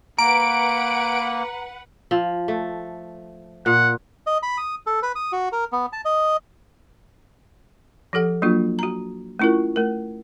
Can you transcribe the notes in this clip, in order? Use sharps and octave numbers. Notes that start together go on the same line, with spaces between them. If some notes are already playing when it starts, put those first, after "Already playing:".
A#3 B4 F#5 A#5 D7
F3
A3
A#2 F#5
D#5
B5
D#6
A4
B4
D#6
F#4
A#4
B3
A5
D#5
F3 G4 A4 F#5
F#3 A#3 D4 F4 F#4
F#4 A#5
A3 C#4 E4 F4 A#4
A3 A#4